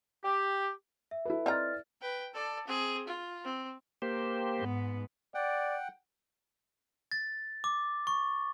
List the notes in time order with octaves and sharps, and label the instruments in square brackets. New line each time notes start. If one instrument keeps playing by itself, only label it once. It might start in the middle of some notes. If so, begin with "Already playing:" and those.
[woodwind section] G4
[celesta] E5
[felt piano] E4 A4 B4
[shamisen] C4 D#4 A#5 [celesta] D5 F6 A6
[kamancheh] B4 G5
A4 D5
C4 G#4
F4
C4
[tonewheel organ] A#3 G4 C5
[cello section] G#2 B3
[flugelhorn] D5 [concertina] F#5 G5
[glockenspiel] A6
D6
C#6